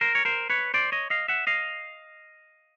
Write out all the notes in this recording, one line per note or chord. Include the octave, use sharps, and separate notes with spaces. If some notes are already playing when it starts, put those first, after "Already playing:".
A#4 C5
C#5
A#4 C5
B4 C#5
C5 D5
C#5 D#5
D#5 F5
E5 F#5
D#5 F5